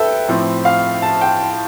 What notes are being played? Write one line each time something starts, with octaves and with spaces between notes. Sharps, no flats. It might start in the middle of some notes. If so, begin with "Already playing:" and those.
Already playing: G2 A4 B4 E5 G5
A2 F3 C4
F5
A5
G5